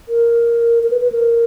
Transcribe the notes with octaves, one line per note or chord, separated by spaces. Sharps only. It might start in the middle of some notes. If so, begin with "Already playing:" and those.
A#4
A#4
B4
B4
A#4